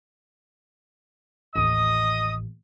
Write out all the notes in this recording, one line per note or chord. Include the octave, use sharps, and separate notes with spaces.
A1 D#2 D#5 D#6